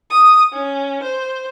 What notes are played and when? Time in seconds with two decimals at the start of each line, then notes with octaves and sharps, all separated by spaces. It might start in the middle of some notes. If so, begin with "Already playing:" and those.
0.10 D#6
0.52 C#4
1.03 C5